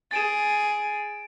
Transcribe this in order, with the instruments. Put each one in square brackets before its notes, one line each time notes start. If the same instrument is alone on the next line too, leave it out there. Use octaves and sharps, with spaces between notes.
[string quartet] G#4 [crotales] A6 D7 E7